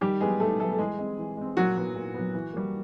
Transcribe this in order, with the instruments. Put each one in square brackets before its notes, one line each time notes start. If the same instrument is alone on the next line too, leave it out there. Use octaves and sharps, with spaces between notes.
[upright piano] D#3 G3 G4
F#3 G#3 B3 G#4
D#3 A3 A4
F#3 A3 B3 A4
A4
E3 G#3 G#4
G#3 C4
E3
G#3 C4
A#2 F#3 F#4
F#3 B3
A#2
F#3 B3
E3
G3 A#3